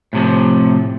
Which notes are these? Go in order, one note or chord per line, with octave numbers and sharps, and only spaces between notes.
A2 C3 F3